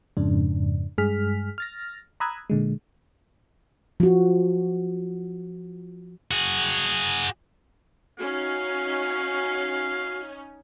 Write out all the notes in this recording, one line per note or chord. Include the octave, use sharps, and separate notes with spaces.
F2 G#2 C#3 D4
G2 G#3 G#4 F6 B6
F6 A6 A#6
A#5 B5 D#6 E6 F#6 G#6
A#2 D3 G#3
F3 F#4
F#4 G#4
C#4 D#4 F#4 F5